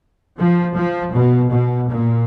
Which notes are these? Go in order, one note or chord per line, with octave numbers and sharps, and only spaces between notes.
F3
F3
B2
B2
A#2